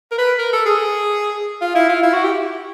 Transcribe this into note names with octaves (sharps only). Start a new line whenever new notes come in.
A#4
B4
A#4
A4
G#4
F4
E4
F4
E4
F#4
G4